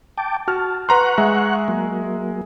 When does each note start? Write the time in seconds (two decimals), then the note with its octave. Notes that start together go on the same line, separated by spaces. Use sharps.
0.18 G5 A5 D6
0.48 F#4 A5 F6
0.89 B4 F#5 A#5 C6 C#6 F#6
1.18 G#3 E5 A#5
1.68 F#3 A#3